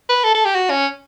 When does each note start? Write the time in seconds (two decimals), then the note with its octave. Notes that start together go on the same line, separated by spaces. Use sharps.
0.09 B4
0.24 A4
0.35 A4
0.45 G4
0.54 F#4
0.71 C#4